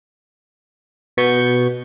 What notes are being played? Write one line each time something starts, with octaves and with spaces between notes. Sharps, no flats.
B2 B3 C#6 G6